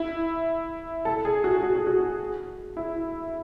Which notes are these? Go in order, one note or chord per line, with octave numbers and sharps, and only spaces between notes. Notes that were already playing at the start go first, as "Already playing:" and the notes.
Already playing: E4
A4
G#4
F#4
F#4
G#4
F#4
E4